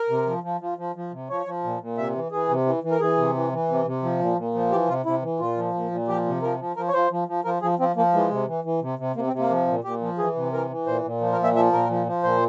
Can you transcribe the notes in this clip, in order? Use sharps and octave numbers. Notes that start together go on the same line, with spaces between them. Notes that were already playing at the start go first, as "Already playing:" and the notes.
Already playing: A#4
C3
F3
F3
F3
F3
F3
C3
F3 C#5
F3
A#2
A#2
C3 E5
E3
E3 G#4
C3
E3
E3
A#4
E3 G#4
C3
E3
E3
C3
C3
F3
A#2
A#2
F3
E3 G4
C3 F4
C3 E4
E3
A#2 F4
F3
A#2
A#2
F3 G4
C3
F3 A#4
F3
F3 A#4
C#5
F3 C5
F3
F3
F3 A#4
F3 G#4
F3 C4
F3 A#3
E3 G#3
C3
E3
E3
C3
C3
C3 A#3
C4
C3
A#3
F3
A#2
A#2 G4
F3
E3 G#4
C3
E3 A#4
E3
A#2 C5
A#2
F3
A#4
A#2
E5
F3 E5
A#2 A#4
F3
F3
A#2 C5